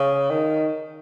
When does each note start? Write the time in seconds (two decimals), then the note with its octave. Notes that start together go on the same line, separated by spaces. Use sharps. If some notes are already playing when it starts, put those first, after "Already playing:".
Already playing: C#3
0.31 D#3